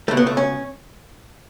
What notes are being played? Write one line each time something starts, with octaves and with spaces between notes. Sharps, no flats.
C#2 B2 A3
B3
A3
C#4